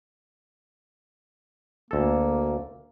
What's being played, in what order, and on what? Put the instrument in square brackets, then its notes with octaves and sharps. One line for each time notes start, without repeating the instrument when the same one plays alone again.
[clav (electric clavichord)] D2 A4 [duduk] A#3